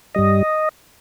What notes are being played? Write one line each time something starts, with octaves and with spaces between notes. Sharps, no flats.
G2 G3 D#5